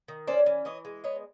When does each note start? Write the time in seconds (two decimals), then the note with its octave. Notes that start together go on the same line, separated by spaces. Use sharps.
0.08 D#3
0.27 C#4 C5 D5
0.46 E3
0.65 E3 C#5 D#5
0.85 G#3
1.04 B3 C#5 D#5